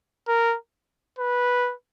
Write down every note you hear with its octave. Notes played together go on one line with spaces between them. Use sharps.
A#4
B4